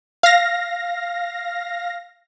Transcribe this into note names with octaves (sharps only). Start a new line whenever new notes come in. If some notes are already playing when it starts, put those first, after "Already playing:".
F5 A#6